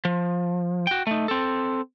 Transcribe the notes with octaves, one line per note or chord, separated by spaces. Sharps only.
F3
F#4 G5
A3 D#4
C4 A4